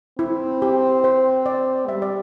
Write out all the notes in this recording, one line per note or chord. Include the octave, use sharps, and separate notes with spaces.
C4 E4
G4
C5
D5
G3 E5
D5